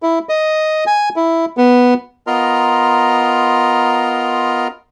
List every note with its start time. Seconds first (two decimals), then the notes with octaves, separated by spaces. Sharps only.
0.02 E4
0.29 D#5
0.87 G#5
1.16 E4
1.57 B3
2.27 B3 F4 A#4 D#5 A#5 C6